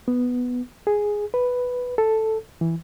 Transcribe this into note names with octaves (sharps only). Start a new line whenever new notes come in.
B3
G#4
B4
A4
E3